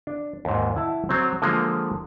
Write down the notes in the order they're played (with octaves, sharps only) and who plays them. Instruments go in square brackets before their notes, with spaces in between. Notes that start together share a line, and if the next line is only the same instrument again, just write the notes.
[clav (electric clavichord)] D4
D#2 G#2
E4 F#5 A5
F#3 C4
D3 F3 G#3 A#3